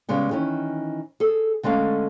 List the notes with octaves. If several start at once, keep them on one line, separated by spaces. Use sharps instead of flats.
C#3 G3 G#3 B3
D#3 E3 C#4
G#4 A4
D3 G#3 A3 C#4 F5